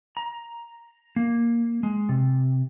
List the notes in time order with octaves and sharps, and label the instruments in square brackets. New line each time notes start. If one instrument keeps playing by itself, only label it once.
[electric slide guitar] A#5
A#3
G#3
C3